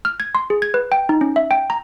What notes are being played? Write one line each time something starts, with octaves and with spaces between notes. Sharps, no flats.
F6
G#6
C6
G#4
G#6
B4
G5
D#4
C#4
E5
G5
A#5